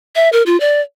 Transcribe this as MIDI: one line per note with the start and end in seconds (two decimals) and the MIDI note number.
0.15 0.29 76
0.33 0.43 70
0.46 0.59 65
0.60 0.81 74